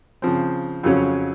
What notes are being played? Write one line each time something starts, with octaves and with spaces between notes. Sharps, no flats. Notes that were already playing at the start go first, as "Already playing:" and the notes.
C#3 F3 C4
F2 C#3 F#3 C#4